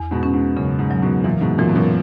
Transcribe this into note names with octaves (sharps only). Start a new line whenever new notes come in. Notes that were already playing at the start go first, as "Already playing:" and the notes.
Already playing: E2
G#2 B2
C#4
G#2
F#2 C#3
G#2
F#3
G#2 B2
F#2 A#2 E3
G#2 B2
F#2 A#2 E3
B2
F#2 A#2